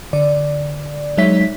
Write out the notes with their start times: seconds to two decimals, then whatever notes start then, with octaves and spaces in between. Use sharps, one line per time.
0.13 D3 D5
1.17 F#3 G#3 D#4 C#5 E5 B6